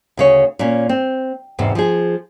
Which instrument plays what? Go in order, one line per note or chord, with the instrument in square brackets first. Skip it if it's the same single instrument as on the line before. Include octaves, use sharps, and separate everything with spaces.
[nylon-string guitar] D2 C#3 C#5
A#2 C#4
C4
E2 G#2 C3
F3 G#4